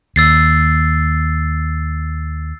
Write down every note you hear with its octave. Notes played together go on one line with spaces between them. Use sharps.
D#2 E6 A6 C7